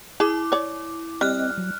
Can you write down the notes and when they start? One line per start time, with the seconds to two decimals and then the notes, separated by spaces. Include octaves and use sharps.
0.20 E4 G#4 D6
0.52 C#5 D5
1.21 G3 C4 D#5 F6 F#6
1.58 F#3